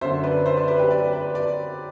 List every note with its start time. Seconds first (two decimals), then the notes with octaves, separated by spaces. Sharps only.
0.01 F#2 D3 C5 E5
0.23 B4 D5
0.46 C5 E5
0.57 B4 D5
0.68 B4 D5
0.79 G4 B4
0.91 B4 D5
1.13 B4 D5
1.35 D5